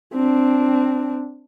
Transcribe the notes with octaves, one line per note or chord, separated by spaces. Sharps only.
C4 D4